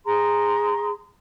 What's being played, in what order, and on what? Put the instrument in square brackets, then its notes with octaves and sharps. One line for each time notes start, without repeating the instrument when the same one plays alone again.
[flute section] G#4 A#5 C6